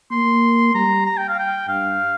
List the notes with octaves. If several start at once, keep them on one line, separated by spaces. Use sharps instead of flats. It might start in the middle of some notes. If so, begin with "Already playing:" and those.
A#3 C6
G3 A#5
A#5
G5
F5
G5
G2 F5